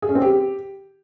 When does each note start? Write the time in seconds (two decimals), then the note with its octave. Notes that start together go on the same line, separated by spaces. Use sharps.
0.02 G#4
0.09 C#4
0.15 C4
0.22 G4